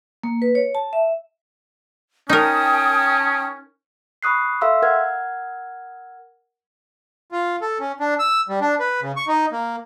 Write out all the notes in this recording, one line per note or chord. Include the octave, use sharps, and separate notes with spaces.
A#3
B4
C#5
A5
E5
C#4 D#4 A#4 G5 A5 D#6
B5 C#6 D#6 F#6 C7
A4 E5 F5 C6 E6
A#4 F#5 F6 G#6
F4
A4
C#4
D4
E6
G3
D4
B4
C#3
C#6
D#4
A#3